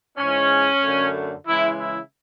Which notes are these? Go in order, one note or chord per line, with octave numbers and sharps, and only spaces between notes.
G#2 E3 G#3 C#4
F#2 D3 A3
C#3 E3 G#3 E4
E4